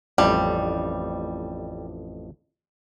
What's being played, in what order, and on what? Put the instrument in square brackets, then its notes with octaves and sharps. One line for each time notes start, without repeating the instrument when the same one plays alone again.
[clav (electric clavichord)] A1 F2 [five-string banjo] G3